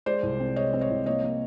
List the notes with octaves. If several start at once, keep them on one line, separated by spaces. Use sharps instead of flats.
G#3 C5 D5
C2
C4
G#3 C#5 D#5
C4
C#5 D#5
C2
A#3 C#5 D#5
A#3